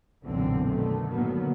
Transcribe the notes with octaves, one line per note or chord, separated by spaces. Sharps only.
B1 F#2 A#2 D3 E3 C4
B2 D3 D#3 A3
A2 D3 D#3 F#3 A#3 B3